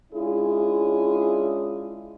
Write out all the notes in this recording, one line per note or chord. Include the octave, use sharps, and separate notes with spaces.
G#3 C#4 D4 E4 F4 G#4